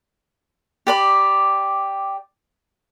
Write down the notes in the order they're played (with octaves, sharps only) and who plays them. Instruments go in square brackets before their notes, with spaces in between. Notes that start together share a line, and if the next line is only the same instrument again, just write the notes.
[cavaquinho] G4 D5 B5